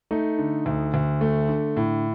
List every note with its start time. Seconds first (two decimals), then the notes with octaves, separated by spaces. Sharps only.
0.11 A3 D#4
0.38 D3
0.66 D2
0.94 D2
1.21 A3
1.49 D3
1.76 A2